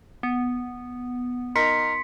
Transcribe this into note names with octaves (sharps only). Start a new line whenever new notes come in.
B3
D#4 A#4 C6 B6 C#7